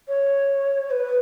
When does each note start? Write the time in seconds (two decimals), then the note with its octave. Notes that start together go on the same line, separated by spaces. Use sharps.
0.08 C#5
0.90 B4